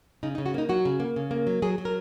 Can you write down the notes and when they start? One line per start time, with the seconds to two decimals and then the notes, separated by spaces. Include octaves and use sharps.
0.23 C#3 D#4
0.35 D#4
0.38 C#3
0.46 F#4
0.54 A#3 D#4
0.69 F#3 F#4
0.85 C#3
1.00 A#3
1.16 C#3
1.31 A#3
1.47 F#3
1.62 F#3 G#4
1.78 F#3
1.85 A#4